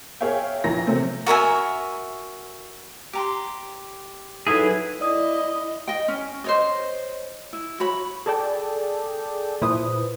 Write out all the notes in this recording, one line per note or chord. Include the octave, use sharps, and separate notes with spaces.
G#4 A#4 C#5 E5 F5 G5
A#1 E3 A#5 A#6
C3 F#3 A3 A#3 C4
F#4 A#4 E5 G#5
G4 A#5 C6
F#3 D#4 E4 G#4 A4 B4
E4 D5 D#5 D#6
D#5 G5
C#4
C5 C#5 D#5
E4
F#4 C#5 B5
G#4 A4 D5 G5 A5
A#2 E4 B4 C5 D#6